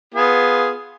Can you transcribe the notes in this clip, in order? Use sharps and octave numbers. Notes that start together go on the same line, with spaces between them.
B3 F4 G#4